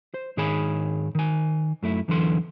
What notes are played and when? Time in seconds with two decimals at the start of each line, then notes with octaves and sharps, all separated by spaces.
0.14 C5
0.37 G#2 D#3 G#4 C#5 G#5 B5
1.15 D#3 G#5
1.83 F#2 A3 E4
2.08 E2 D3 E3 F#3 A4 C6